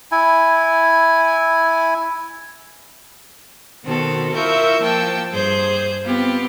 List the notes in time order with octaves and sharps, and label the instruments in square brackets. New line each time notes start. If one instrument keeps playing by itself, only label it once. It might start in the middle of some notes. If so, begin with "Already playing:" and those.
[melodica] E4 G#5
[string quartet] B2 D#3 B3 C4 F#4 A4
E4 F4 A#4 E5 C#6 G6
F3 A#3 G5 A5 E6
G2 G#4 C5 G6
B3 C4 F4 G4 B4